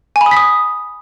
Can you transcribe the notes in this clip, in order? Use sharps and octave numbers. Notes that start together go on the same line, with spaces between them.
G#5
B5
D#6
B6
D#6